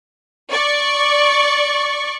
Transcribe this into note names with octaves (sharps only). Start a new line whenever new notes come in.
D5 C#6